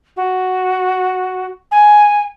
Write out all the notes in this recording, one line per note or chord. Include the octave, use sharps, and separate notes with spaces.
F#4
G#5